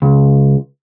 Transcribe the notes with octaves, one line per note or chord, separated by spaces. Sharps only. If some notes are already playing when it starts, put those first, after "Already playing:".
C#2